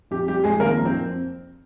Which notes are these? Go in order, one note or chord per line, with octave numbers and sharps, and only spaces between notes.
F2 G4
G3 G4
F2 G#3 G#4
D#3 A#3 A#4
F2
C4 C5
F2